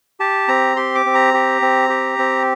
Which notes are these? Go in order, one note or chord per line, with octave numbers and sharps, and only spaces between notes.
G4 A5
C4 A#5
G4 C6
D6
C4
A#5
G4
C4
G4
C4